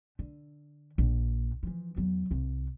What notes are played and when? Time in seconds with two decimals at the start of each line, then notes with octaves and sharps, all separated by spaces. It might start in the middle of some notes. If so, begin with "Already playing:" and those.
0.19 D3
0.98 A#1
1.63 E3 F3
1.96 E2 F#3
2.31 C2